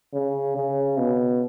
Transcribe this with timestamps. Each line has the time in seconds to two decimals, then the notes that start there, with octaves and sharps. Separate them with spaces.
0.14 C#3
0.56 C#3
0.98 B2